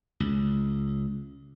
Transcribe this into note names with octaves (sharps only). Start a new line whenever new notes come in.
C#2